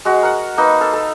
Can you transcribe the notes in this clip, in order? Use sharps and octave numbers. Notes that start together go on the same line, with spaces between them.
G#3 F#4
A#4 F#5
A#3 D#4 B4
A4 F5
A4